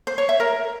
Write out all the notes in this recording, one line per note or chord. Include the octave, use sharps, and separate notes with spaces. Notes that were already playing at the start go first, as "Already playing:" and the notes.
C5
C#5
E5
A#4